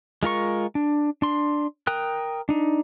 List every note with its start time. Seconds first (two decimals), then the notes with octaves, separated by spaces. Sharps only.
0.23 G#3 F4 A#4 C#6
0.75 D4
1.22 D4 C6
1.87 A#4 G5 D#6 F#6
2.49 D4 D#4